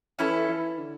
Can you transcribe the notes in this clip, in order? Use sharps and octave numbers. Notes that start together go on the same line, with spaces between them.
E3 C#4 E4 A4
E3
D3